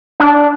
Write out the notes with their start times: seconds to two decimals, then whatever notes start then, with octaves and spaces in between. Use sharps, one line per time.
0.20 D4